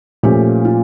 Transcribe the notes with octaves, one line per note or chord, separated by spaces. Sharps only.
A#2 F3 A3 C#4 G4
F4